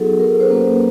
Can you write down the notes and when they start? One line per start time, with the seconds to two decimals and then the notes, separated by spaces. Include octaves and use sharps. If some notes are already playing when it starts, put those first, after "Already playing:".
Already playing: F#3 B3 D#4 F#4 G#4 A4
0.20 A#4
0.40 C5
0.48 F#3 A#3 C#4 B4